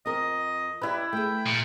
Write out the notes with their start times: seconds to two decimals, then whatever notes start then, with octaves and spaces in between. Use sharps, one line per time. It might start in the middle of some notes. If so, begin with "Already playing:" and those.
0.06 F2 A#4 D#5
0.81 E4 G4 B4 D5
1.13 A3 G#4 G5
1.47 A#2